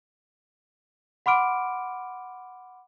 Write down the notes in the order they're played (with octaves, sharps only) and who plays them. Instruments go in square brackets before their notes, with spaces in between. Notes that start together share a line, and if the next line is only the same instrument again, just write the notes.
[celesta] F#5 B5 C6 D6 F6 D7